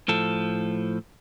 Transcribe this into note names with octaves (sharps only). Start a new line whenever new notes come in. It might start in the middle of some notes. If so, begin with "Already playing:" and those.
A2 F3 A4